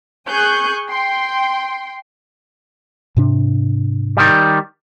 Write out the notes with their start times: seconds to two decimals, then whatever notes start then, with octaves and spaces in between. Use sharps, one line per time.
0.30 G#4 G#5 C#6 F#6 G6
0.89 G5 C6
3.17 G#2 C3 D4
4.17 D#3 G3